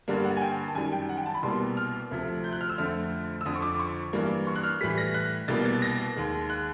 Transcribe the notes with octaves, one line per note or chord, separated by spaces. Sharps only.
G2 D3 G3 A#3
F#5
G#5
G5
A5
F#2 D#3 G3 G#5
G5
F#5
G5
A5
B5
C2 B2 G3 A#3 C6
F6
D2 C3 F3 A3
G6
F#6
F6
E6
F2 D3 F3 A3 F6
E6
F2 D3 F3 D#6
C#6
D6
D6
C#6
G2 E3 G3 A#3
C#6
F#6
F6
A2 E3 G3 B6
A#6
F#6
C2 B2 G3 A#3 A6
A6
A#6
D#2 D#3 G#3
F#6